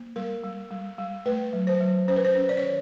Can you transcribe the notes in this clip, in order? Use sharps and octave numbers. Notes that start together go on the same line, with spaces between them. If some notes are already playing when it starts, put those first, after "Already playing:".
Already playing: A#3
G3 A#4
G3
G3
G3
A3 B4
F#3
C5
F#3
C#4 C5
B4
C5
C#4
D5
C#5
D#3